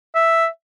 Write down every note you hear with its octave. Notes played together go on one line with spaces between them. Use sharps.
E5